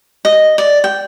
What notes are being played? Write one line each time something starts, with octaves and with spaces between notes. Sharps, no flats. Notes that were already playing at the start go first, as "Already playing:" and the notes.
D#5
D5
G5